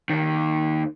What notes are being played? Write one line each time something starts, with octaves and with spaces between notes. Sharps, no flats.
D#2 D#3